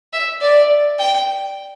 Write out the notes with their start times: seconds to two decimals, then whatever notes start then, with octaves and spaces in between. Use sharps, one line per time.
0.13 E5
0.41 D5
0.99 G5